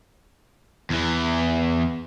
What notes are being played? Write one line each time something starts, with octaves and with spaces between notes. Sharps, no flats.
E2 E3